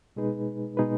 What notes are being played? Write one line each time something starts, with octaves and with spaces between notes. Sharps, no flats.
B2 G#3 D#4 G#4 B4
B2 G#3 D#4 G#4 B4